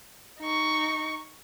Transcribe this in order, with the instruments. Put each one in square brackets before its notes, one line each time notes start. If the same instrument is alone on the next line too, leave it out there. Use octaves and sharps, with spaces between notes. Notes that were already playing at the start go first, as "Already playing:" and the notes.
[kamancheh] D#4 C#6